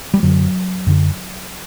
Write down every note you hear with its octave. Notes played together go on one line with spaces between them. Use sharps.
G3
F#2 D3 F#3
F#2 D3